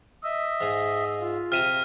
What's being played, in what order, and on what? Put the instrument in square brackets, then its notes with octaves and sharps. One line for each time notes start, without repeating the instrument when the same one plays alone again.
[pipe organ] D#5 E5
[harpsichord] G#2 G#4
[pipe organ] F4
[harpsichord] C3 E5 A#5 [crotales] F6 D#7